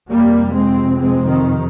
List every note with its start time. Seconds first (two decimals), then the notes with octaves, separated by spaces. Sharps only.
0.11 F2 C3 G3 A#3
0.55 G#3 C4
0.98 G#3 C4
1.27 D#3